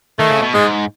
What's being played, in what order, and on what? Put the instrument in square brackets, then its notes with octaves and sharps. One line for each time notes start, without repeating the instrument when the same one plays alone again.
[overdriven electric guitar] D#3 [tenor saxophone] A3
[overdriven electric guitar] C#3
B2
[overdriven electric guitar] G#2 [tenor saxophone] G#3